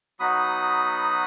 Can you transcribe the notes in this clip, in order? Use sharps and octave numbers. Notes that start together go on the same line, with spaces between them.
F#3 B3 D#4 F#4 B5 D#6